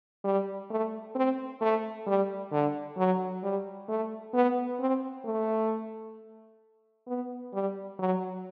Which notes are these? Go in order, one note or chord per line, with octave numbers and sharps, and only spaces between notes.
G3
A3
C4
A3
G3
D3
F#3
G3
A3
B3
C4
A3
B3
G3
F#3